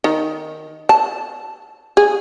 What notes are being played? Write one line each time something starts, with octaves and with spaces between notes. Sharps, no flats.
D#3
A5
G#4